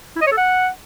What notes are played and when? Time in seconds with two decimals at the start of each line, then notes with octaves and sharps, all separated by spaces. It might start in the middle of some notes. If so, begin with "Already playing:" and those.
0.16 E4
0.21 D#5
0.27 C#5
0.32 A4
0.37 F#5